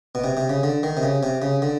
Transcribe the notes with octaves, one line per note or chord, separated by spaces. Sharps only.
B2
C3
C3
C#3
D3
D#3
C3
C#3
C3
C#3
D3